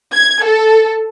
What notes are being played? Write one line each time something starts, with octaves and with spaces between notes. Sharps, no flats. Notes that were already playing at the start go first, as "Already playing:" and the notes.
G#6
A4